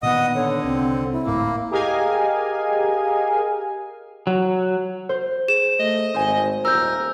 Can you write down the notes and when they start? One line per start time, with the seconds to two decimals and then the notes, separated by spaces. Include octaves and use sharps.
0.03 A#2 D#3 B3 D#5 F#5 D#6
0.35 D3 C#5
0.64 C2 C4
1.12 E4
1.26 D1 G#1 A2 A#3
1.71 G4 G#4 A#4 D#5 F5 G#5
4.27 F#3
5.09 C5
5.48 G#4 E7
5.80 A3 D#5
6.14 G#1 C5 G#5
6.65 D#1 A#4 E6 G6